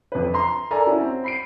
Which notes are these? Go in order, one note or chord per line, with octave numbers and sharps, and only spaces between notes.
F2 B4
A#5 C6
A4 A#4 D5 G#5 A#5
C#4 E4 F#4
C4
B5 C7 D7